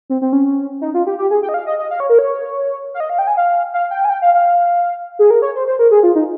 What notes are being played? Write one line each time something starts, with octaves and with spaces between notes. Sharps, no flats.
C4
C4
C#4
D#4
F4
G4
G4
G#4
G5
D#5
F5
D#5
D#5
F5
C#5
A#4
C#5
F5
D#5
F5
G5
G#5
F5
F5
G5
G#5
G5
F5
F5
G#4
A#4
C#5
C5
C5
A#4
G#4
F4
D#4